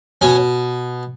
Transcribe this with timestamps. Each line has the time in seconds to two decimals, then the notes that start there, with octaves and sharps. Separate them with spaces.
0.21 B2 C#4